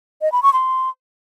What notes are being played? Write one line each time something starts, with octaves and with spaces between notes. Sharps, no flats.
D#5
B5
C#6
C6